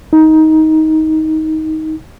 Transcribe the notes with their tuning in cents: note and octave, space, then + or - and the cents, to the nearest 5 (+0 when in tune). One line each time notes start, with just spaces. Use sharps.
D#4 +15